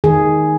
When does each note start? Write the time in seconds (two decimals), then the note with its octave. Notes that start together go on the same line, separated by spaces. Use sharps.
0.04 D#3 G#4